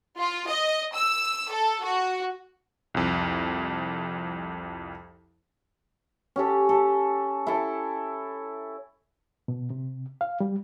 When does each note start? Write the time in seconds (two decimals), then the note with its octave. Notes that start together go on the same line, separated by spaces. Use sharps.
0.18 F4
0.46 D#5
0.94 E6
1.51 A4
1.83 F#4
2.94 C2 F2
6.36 C#4 G4 A4
6.69 A4
7.47 E4 A4
9.48 B2
9.70 C3
10.21 F5
10.40 G3